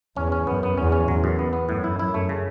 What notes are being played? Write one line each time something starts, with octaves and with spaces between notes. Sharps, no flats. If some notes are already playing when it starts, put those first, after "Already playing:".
E2 C#4
C#4
F#2 B3
B3
E2 C#4
C#4
E2 F#3
F#2
B3
B3
F#2 A2
E4
F#2 E4
A3
C#3